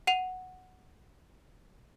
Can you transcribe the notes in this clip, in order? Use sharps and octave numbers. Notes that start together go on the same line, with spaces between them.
F#5 D#7 F7